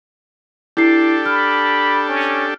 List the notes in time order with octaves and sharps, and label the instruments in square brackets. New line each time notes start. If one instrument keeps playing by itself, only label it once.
[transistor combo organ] D4 G4 A4 [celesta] E4 C7
[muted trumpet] B5 [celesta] F6
[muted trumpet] C#4